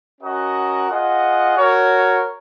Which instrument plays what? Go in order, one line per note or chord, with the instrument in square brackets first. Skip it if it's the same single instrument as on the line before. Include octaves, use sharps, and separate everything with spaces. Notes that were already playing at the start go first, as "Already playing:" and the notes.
[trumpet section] C#4 F#4 A#4 D#5 F#5
F4 G#4 D#5 F#5
F#4 A#4 C#5